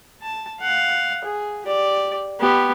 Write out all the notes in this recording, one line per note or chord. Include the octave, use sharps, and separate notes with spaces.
A5
F5 F#5
G#4
G4 D5
B3 G4